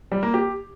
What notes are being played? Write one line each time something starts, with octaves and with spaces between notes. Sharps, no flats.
G3
A#3
G4